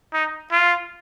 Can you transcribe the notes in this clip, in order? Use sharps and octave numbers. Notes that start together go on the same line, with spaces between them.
D#4
F4